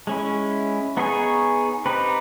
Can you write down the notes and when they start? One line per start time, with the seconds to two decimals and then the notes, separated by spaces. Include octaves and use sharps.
0.07 G#3 C#4 E4
0.97 B3 D#4 G#4 C#5
1.86 C4 D#4 G4 B4